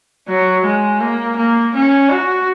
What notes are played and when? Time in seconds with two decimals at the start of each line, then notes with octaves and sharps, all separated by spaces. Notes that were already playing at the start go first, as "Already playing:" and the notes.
0.27 F#3
0.64 G#3
1.00 A#3
1.37 A#3
1.74 C#4
2.10 F#4